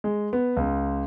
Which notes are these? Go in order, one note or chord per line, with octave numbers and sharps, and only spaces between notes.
G#3
B3
C#2